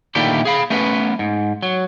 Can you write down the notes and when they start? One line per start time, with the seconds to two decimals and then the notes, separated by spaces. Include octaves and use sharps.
0.15 A#2 D3 D#3 A3 E4 G4
0.45 G#4 F5 B5
0.70 A3 B3 C#4 B4
1.19 G#2
1.63 F#3